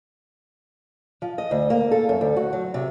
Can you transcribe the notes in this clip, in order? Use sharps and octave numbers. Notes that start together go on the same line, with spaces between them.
F3
D#5
D2
A#3
A4
F#2
D2
F#4
F#3
C3